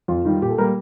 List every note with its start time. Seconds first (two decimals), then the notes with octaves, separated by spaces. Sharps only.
0.08 F2 F4
0.25 D#3 G3
0.42 A#2 G4
0.50 A4
0.58 G3 A#3 A#4